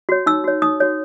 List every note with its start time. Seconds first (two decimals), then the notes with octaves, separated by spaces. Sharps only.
0.09 F#4 C#5
0.26 D#4 E6
0.44 F#4 C#5
0.62 D#4 D#6
0.80 F#4 C#5